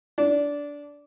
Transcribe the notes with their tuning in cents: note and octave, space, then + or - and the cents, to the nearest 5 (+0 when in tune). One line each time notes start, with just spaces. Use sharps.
D4 -15